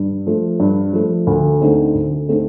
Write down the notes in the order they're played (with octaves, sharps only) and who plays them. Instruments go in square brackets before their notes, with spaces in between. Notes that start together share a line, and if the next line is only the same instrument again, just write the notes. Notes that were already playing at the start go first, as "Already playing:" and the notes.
Already playing: [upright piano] G2
F3 A3
G2
F3 A3
D2
D3 A3 C4 D#4
D2
D3 A3 C4 D#4